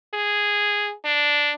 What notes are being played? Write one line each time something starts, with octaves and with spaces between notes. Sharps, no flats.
G#4
D4